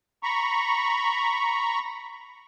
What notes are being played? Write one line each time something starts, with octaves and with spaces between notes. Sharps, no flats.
A#5 B5 C#6